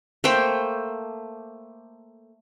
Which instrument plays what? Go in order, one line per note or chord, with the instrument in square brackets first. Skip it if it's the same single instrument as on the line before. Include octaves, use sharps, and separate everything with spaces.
[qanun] A3 A#3 C5 G5